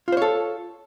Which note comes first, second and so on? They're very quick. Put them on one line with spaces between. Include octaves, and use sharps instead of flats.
F4 C5 C#5 A4